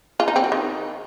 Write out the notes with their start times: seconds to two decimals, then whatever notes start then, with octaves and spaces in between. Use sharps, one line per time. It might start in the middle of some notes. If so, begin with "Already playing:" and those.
0.20 F4
0.28 D#4
0.36 C4
0.44 F#4
0.52 D#3